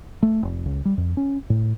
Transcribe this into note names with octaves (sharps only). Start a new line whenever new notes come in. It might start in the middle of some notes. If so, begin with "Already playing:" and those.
A3
F1
C#2
G3
F2
C#4
A2